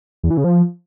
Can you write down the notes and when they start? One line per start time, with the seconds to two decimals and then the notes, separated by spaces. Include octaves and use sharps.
0.23 E2
0.30 E3
0.37 C#3
0.44 F3